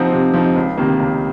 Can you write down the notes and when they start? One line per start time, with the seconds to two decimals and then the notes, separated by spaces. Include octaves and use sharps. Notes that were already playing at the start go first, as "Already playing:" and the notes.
Already playing: C3 F3 C4 D#4 F#5
0.12 C3
0.34 F3 C4 D#4
0.56 C#2
0.78 C3 D#3 A#3
1.00 C#2